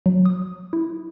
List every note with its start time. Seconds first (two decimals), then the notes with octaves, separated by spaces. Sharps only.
0.06 F#3
0.25 D#6
0.73 E4